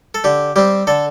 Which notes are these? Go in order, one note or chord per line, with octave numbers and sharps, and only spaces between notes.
A4
D3 G4
G3 C4 G4
D3 A4